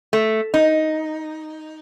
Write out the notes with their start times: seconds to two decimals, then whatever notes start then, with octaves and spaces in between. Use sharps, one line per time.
0.13 A3
0.54 D#4